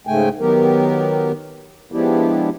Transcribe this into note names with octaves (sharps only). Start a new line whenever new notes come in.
G#2 C#3 A3 G5 G#5
D#3 F#3 B3 G4 A#4
F3 G#3 B3 D4 E4 G4